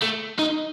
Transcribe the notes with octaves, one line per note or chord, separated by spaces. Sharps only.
A3
D#4